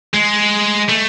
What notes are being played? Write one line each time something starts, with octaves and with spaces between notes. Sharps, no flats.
G#3
A3